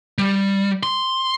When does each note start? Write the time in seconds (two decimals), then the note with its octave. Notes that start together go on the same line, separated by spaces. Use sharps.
0.18 G3
0.83 C6